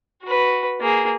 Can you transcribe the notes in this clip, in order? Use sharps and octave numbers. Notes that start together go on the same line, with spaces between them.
F#4 B4
A#3 G#4